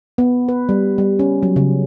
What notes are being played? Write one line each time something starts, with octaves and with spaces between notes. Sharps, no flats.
B3
B4
G3
G3
C#4
F#3
C#3